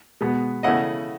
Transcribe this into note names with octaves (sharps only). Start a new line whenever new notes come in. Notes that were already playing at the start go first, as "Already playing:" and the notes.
B2 G#3 B3
C#3 E3 A3 C#4 E4 D#5 F#5